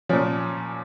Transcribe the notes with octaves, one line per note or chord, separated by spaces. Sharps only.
A#2 F3 C#4